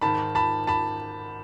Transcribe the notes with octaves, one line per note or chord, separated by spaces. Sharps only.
G#2 D#3 A5 B5
A5 B5
A5 B5